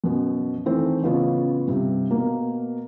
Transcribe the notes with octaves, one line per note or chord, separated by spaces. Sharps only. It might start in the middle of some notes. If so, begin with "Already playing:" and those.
F#2 B2
D#3 E3 A3 C4 C5
A1 C#3 B3 F4 C#5
G2 C3
B2 A#3